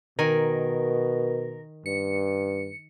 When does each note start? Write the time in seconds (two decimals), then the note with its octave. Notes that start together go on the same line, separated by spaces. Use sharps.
0.19 B2 D#3 A#4 G#5
1.86 G2 C#7